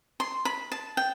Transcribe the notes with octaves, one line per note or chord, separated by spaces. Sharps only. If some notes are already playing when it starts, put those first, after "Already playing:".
C6
B5
A5
G5